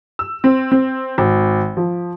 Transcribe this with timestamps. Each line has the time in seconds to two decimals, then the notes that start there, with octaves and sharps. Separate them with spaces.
0.19 E6
0.44 C4
0.71 C4
1.18 G#1
1.77 F3